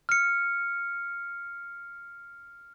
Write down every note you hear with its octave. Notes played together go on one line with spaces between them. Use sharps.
F6 C#7